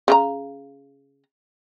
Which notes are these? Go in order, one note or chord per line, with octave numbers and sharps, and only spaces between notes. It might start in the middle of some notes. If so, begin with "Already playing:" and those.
C#3 E4 A#5